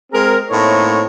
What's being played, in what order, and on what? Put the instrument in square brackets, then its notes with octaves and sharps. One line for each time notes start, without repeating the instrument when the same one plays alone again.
[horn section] G#3 C4 G#4 A#4
A2 A3 A#3 C4 D#4 C#5